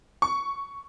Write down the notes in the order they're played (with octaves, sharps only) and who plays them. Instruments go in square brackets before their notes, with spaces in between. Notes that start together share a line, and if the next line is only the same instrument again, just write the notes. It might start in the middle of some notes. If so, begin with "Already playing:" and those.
[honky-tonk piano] C#6